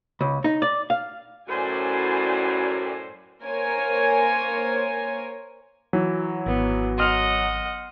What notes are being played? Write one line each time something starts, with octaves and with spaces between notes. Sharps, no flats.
C#2
D#4
D5
F5
F#2 A2 F#4 C5 D5 G#5
A#3 A#4 C5 C#5 G#5
E3 F#3
G#1 B3
D#5 F#5 C6 F6 F7